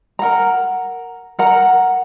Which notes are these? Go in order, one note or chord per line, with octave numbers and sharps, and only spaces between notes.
A#4 F#5 A#5
A#4 F#5 A#5